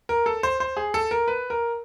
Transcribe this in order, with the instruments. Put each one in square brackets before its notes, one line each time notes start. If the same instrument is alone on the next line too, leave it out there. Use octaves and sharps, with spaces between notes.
[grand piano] A#4
A4
C5
C5
G#4
A4
A#4
B4
A#4